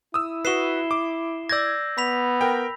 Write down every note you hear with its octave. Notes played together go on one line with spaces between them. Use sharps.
E4 D#6 E6
F#4 B4 C7 E7 G7
D6
D5 E6 G6 G#6 A#6
B3 B5 B6 F7
A#4 G5